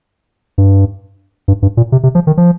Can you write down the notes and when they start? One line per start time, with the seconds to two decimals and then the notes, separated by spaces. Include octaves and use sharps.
0.58 G2
1.48 G2
1.62 G2
1.77 A#2
1.92 C3
2.03 C3
2.15 F3
2.27 D#3
2.37 F3